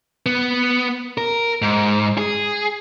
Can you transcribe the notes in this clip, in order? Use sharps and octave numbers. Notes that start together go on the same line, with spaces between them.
B3
A#4
G#2
G#4